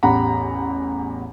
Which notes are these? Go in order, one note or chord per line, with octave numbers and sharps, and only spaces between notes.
A1 E2 G4 F#5 A#5 B5